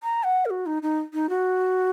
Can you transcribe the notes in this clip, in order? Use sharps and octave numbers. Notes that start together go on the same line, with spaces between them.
A#5
F#5
A#4
F#4
D#4
D#4
D#4
F#4